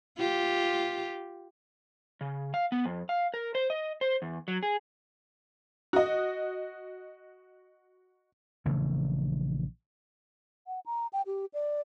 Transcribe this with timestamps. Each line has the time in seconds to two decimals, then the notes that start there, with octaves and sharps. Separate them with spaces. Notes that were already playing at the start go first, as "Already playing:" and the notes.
0.18 F4 G4
2.21 C#3
2.54 F5
2.72 B3
2.85 F2
3.09 F5
3.34 A#4
3.55 C5
3.70 D#5
4.01 C5
4.22 E2
4.48 F#3
4.63 G#4
5.93 F#4 D#5
8.65 A#1 C#3 E3 A3
10.67 F#5
10.86 A#5
11.13 G5
11.26 G4
11.54 D5